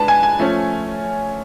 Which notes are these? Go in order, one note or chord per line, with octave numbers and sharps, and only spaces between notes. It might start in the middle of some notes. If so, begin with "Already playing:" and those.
Already playing: G#3 D4 B4 A5
G#5
G#5
F3 A3 C#4